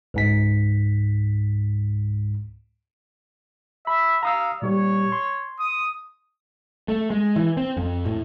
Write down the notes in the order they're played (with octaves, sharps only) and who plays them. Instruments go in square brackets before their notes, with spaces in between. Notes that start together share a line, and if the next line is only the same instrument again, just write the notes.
[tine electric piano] C#2 G#2 B6
[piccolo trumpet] E5 [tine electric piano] B5
[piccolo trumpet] F5 [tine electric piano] A#5 D#6 E6
[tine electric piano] A#2 G3 G4 [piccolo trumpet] C#5
[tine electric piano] C6
[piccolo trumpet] D#6
[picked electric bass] A3
G#3
E3
C4
F2
A2